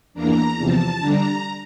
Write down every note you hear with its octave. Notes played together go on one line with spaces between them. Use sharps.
E2 E3 A#3 D4 A#5
E2 C3 F3 A5
D3 G3 D4 A#5